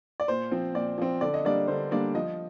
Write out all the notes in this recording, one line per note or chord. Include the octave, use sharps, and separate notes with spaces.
D5
A#2 C5
F3 C4
A#2 D5
F3 C4
D3 D5
D#5
G3 A#3 D4 D5
D3 C5
G3 A#3 D4 D5
F3 D#5